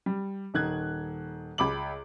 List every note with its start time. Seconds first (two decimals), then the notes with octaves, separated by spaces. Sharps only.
0.06 G3
0.54 D#1 D#3 F#6 G#6
1.58 C#2 B5 D6 F#7